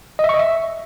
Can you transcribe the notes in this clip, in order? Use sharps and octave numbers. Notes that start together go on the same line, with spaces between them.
D#5
E5
C#6
D#5
E5